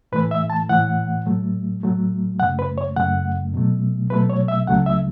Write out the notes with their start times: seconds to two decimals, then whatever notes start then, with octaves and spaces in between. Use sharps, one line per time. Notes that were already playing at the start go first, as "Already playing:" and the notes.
0.12 A2 E3 A3 B4
0.31 E5
0.50 A5
0.69 A2 E3 A3 F#5
1.26 A2 F#3 A3
1.83 A2 F#3 A3
2.40 F#2 C#3 A3 F#5
2.59 B4
2.78 C#5
2.96 F#2 C#3 A3 F#5
3.54 B2 F#3 A3
4.10 B2 F#3 A3 B4
4.30 C#5
4.48 E5
4.67 C#2 C#3 F#3 A3 F#5
4.86 E5